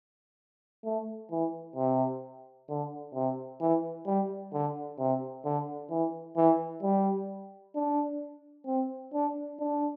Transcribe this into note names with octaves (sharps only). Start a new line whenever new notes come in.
A3
E3
C3
D3
C3
E3
G3
D3
C3
D3
E3
E3
G3
D4
C4
D4
D4